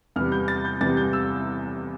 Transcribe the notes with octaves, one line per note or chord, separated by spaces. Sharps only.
E2 C3 G3 B3 F6
G6
A6
G6
E2 C3 G3 B3 A6
G6
E6